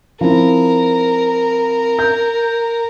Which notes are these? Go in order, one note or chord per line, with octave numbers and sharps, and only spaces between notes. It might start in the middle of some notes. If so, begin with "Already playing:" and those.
F3 C4 E4 A#4
G6